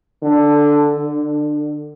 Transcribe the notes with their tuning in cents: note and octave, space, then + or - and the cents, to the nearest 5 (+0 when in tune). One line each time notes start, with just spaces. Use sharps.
D3 +0
D3 +25